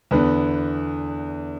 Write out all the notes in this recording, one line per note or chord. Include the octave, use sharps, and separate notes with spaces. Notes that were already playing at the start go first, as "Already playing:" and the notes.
E2 D3 B3 B4